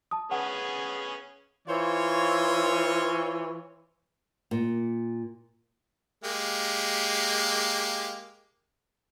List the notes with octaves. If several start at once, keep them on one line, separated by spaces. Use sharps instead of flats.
A5 D#6
B3 C#4 G#4 F#5
E3 F4 C5 C#5
A#2
G#3 A#3 G4